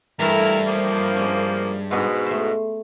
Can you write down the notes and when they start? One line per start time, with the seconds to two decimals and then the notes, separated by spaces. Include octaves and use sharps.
0.20 G2 E3 A3 E4 A#4
0.67 F3 A#3
1.17 G#3 C#4
1.91 G#2 B2 G#3 B3 D4
2.26 A3 C5